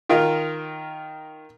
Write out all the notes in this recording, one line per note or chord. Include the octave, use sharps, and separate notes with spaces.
D#3 F4 A#4